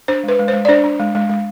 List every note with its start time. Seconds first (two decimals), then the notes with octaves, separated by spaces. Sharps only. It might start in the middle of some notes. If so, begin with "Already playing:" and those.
0.08 D4 C5
0.23 G#3 B4
0.39 G#3
0.48 C5
0.53 G#3
0.65 D5
0.69 D4 C5
0.84 D4
1.00 G#3
1.15 G#3
1.29 G#3